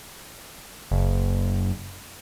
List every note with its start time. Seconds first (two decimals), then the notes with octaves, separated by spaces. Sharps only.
0.91 F#1